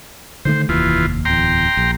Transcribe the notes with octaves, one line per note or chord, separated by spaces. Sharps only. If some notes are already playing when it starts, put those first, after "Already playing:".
D3 D#3 A3 C5
F1 D#2 E3 F4
D1 E2 G5 A#5 C6
A#1